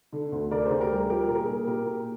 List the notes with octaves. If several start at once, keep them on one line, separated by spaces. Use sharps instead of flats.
D3
D2
D3 A#4 D5
D2 G#4 C5
G4 A#4
G3
G#4
F3 G4 A#4
A#2
A#4
G#4
A#2
A#2 G4 A#4
A#2